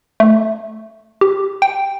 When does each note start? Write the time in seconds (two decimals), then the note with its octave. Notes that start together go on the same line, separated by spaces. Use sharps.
0.20 A3
1.21 G4
1.62 G5